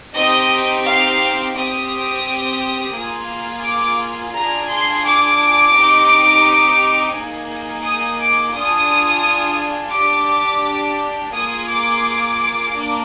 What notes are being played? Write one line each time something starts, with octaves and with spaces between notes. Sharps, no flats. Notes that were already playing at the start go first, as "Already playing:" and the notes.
C4 D#4 G4 D#5
F5
C4 G4 D#6
A#3 F4 G#4
D6
D4 F4 G#4 A#5
C6
D6
C4 D#4 G4
A#3 D#4 G#4
D#6
D6
D4 F4 G#4 D#6
D4 G4 D6
A#3 F4 G#4 D#6
D6
A#3 D4